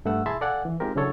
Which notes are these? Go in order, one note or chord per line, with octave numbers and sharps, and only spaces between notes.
G2 A3 B4 F#5 E6
E4 G#4 E5 A5 B5 C6
A4 D5 F5 F#5 G#5 F#6
E3
G#3 C4 D#4 F4 G4 A#4
C#3 F#3 D4 E4 A4 C#5